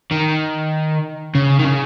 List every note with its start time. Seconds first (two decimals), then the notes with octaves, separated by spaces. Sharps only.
0.12 D#3
1.35 C#3
1.60 D#3
1.65 C#3